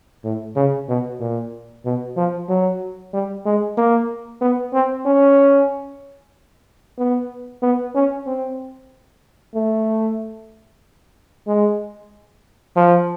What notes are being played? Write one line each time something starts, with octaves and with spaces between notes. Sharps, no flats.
A2
C#3
B2
A#2
B2
F3
F#3
G3
G#3
A#3
B3
C4
C#4
B3
B3
C#4
C4
A3
G#3
F3